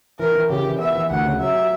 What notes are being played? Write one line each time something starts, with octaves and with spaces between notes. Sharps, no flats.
E3 A#4
E3
C#3 G4
E3
B3 E5
E3
D2 F#5
C#3
F#3 E5
G4